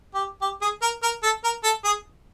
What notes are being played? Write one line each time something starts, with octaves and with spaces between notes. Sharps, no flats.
G4
G4
G#4
A#4
A#4
A4
A#4
A4
G#4